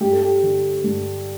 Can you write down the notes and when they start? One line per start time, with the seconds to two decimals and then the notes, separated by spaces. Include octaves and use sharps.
0.01 G2 G4
0.11 A4
0.22 G4
0.43 D3
0.84 G2